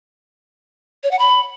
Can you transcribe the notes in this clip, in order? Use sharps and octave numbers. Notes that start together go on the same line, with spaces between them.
C#5
F#5
B5